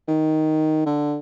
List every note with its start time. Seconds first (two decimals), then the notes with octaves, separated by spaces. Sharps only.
0.08 D#3
0.86 D3